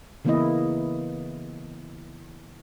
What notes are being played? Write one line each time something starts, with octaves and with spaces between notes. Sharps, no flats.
C#3 E3 A#3 B3 E4 D#5